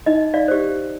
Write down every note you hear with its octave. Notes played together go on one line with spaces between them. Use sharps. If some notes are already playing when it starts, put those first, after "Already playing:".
D#4 D#5
D5 F5
G4 C5